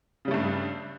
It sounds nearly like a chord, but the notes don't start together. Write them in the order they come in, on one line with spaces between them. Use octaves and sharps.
C#3 G3 A3 G2